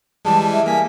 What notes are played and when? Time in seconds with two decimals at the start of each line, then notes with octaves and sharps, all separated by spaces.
0.25 E3 G3 G#3 A5
0.52 E5
0.66 A#3 G#5 B6